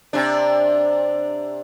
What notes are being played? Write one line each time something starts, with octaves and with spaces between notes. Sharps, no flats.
C3 D4